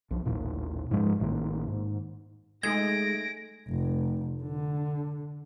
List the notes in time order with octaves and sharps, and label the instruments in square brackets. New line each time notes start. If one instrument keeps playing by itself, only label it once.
[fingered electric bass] B1 F3
A1 D#2 A#2
G#2 F3 G#3
A1 A2 D#3 A#3
G#2
[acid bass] G#3 [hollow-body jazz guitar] A3 D#4 G#4 [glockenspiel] G#6 [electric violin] A#6 D7
[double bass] F1
D3